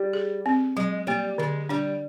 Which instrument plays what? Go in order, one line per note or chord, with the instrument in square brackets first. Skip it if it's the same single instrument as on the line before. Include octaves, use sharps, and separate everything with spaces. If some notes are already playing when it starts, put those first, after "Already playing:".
Already playing: [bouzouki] G3
[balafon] G#4
C4
[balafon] F#3 [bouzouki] G#3
[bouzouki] G3 [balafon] A#3
[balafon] D3 [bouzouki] G#3
[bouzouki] G3 [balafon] D4